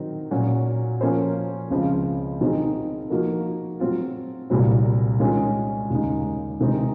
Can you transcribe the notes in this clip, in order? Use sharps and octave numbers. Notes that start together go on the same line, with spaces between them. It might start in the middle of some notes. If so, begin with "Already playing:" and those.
Already playing: D#3 F#3 C4 D#4
A#2 F#3 C#4 F#4
F3 A#3 C#4 F4 C5
C#2 C#3 F3 C4 F4
D#3 F#3 C4 D#4 G#4
F3 A#3 D#4 F#4 A#4
F#3 C4 F4
C2 A#2 F#3 C4 F#4
D#3 G#3 C#4 F4 A#4
D#2 C#3 G#3 D#4
C3 D#3 G#3 C4 D#4